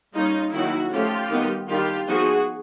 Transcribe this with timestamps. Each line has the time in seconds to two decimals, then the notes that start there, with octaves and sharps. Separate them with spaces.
0.14 G3 A#3 C#4 D#4 F4
0.53 D#3 F#3 A#3 D#4 E4 F#4
0.91 F3 A3 C#4 F4 G4
1.30 D#3 G3 B3 D#4
1.69 D#3 G3 A#3 D4 F4 G4
2.08 F3 G#3 B3 D#4 F#4 G#4